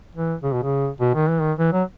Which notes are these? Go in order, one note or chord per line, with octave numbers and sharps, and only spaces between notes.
E3
C#3
B2
C#3
B2
D#3
E3
D#3
E3
F#3